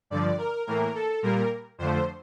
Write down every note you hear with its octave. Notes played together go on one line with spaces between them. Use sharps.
G2 D3 F3 D5
A#4
A2 E3 A#3 A#4
A4
A#2 G3 A#3 A#4
F2 D3 F3 A3 C5